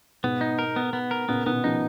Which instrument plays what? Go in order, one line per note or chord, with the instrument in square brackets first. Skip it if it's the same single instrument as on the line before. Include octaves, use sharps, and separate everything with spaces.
[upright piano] G#2 B2 [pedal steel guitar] B3
[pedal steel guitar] D#4
A#4
B3
B3
A#4
[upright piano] A#2 C#3 [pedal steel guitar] B3
[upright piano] B2 D#3 [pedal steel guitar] B3
[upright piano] C#3 F3 [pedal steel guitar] D#4